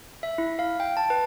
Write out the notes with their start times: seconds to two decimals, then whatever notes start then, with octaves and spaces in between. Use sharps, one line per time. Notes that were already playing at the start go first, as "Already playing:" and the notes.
0.23 E5
0.38 E4
0.59 F5
0.80 G5
0.97 A5
1.10 B4